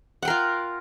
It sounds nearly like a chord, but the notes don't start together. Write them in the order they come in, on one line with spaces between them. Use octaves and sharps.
F#5 G5 A#4 F4